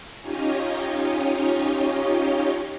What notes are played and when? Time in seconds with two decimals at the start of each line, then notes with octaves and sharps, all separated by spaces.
0.20 C#4 D#4 F4 G4 C#5 D#5